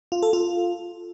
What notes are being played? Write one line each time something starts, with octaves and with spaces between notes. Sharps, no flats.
F4
A4
F4